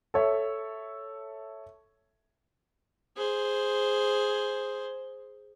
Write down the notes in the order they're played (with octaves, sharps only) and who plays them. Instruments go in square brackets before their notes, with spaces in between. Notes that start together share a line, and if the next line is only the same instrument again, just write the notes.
[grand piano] A4 C#5 E5
[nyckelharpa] G#4 C5